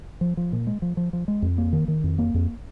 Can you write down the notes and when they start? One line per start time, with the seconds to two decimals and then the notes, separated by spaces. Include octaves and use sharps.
0.21 F3
0.37 F3
0.53 A#2
0.67 G#3
0.82 F3
0.97 F3
1.13 F3
1.28 G#3
1.42 F2
1.58 A#3
1.73 D#3
1.88 D#3
2.04 F2
2.19 A#3
2.34 F2